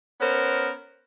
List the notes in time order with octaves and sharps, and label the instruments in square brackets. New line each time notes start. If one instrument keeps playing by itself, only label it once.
[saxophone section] B3 C#4 A#4 C5